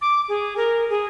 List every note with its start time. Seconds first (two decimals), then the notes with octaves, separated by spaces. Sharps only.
0.01 D6
0.28 G#4
0.57 A#4
0.90 G#4